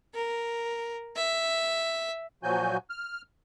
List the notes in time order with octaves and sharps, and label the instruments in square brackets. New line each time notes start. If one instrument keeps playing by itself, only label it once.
[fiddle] A#4
E5
[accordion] A#2 F3 F#3 F#4 G#5 G6
F6